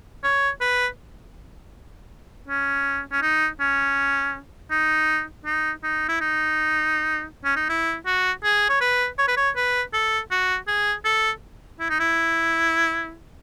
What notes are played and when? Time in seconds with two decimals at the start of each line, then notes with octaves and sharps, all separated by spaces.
0.24 C#5
0.61 B4
2.47 C#4
3.12 C#4
3.21 D#4
3.60 C#4
4.71 D#4
5.45 D#4
5.83 D#4
6.08 E4
6.21 D#4
7.44 C#4
7.56 D#4
7.69 E4
8.06 F#4
8.44 G#4
8.69 C#5
8.80 B4
9.18 C#5
9.28 B4
9.37 C#5
9.56 B4
9.93 A4
10.31 F#4
10.67 G#4
11.05 A4
11.80 E4
11.89 D#4
12.00 E4